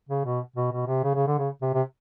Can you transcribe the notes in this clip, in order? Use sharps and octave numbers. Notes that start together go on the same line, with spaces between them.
C#3
B2
B2
B2
C3
C#3
C#3
D3
C#3
C3
C3